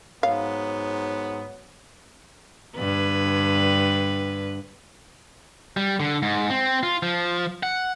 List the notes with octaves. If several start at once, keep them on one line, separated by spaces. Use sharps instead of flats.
G#2 F#3 B3 F5
G2 D3 B4
G3
D3
G#2
C4
F4
F3
F#5